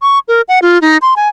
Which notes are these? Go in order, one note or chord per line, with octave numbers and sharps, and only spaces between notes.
C#6
A#4
F#5
F4
D#4
C6
G#5